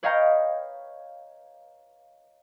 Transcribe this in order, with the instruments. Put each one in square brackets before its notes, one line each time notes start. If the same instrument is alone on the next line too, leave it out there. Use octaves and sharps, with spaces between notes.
[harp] B4 C#5 D#5 F5 G5 A#5